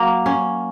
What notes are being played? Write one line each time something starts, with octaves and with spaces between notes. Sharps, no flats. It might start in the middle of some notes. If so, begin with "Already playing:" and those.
Already playing: F#3 A#3
C#4